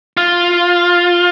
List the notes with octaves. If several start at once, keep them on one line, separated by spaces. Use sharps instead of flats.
F4